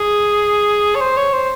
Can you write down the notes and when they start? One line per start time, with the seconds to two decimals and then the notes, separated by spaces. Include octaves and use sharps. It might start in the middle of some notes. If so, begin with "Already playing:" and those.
Already playing: G#4
0.95 C#5
1.01 C5
1.17 C#5
1.33 C5